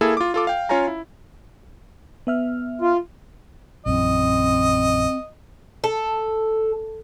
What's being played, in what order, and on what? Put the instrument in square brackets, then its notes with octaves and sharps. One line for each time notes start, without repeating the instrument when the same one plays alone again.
[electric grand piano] A#3 E4 G#4 A4
F4 D6
F4 A4 D6
F5 G5
C#4 F4 C#5 F5 G#5 A#5
E4
[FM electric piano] B3 E5 F6
[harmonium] F4
[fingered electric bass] A#1 F#2 E3 [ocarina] C4 [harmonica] D#5
[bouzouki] A4